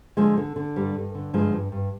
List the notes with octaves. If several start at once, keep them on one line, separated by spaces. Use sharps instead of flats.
D3 F3 G#3
D3
D3
G2 G3
G2
D3
G2 F3 G#3
G2
G2